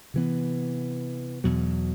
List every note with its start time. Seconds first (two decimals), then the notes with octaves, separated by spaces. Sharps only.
0.14 C3 E3 B3
1.44 E2 B2 F#3